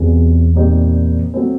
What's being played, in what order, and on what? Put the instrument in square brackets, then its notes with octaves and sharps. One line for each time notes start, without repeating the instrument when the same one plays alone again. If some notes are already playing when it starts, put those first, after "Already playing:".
Already playing: [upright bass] E2 [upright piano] B2 G3 C4 F4 G#4
[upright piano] A#2 G3 C4 D#4 G4
F#3 A3 C4